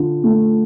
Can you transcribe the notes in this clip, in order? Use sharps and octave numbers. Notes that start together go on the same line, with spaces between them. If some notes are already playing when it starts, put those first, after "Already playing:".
Already playing: D3 F4
A3